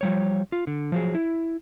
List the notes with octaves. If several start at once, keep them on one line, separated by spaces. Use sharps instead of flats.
F3 G3 C#5
F4
D3
F3 F#3 G#4
E4